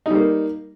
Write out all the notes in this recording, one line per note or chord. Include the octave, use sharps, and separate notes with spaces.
G3 A#3 D#4